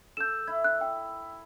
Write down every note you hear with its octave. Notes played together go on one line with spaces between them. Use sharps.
A4 G6 E7
E4 G#6
F#6
G5